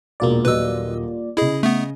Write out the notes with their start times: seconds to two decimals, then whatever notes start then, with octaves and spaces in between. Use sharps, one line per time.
0.20 E1 A#1 B2 A#3 F4 D5
0.45 D#1 F#3 B4 D#5 E6
1.37 C#3 E4 G#4 D#5
1.63 A3 B3